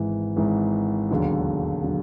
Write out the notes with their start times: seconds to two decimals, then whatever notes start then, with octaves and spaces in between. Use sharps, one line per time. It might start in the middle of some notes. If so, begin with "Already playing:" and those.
Already playing: G#1 G#2 E3
0.36 G#1 G#2 E3
1.10 E1 D#2 D3 F#3
1.83 D3 F#3